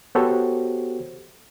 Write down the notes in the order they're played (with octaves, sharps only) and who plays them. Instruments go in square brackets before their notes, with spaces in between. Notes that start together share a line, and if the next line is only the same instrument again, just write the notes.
[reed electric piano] B3 F#4 G4 A4 C5 C#5